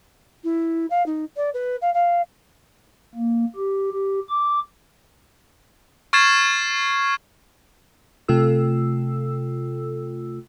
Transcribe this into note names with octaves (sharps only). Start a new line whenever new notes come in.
E4
F5
D#4
D5
B4
F5
F5
A#3
G4
G4
D6
C#6 F6 G#6 A6 C7 E7
C3 A3 F4 A4 E6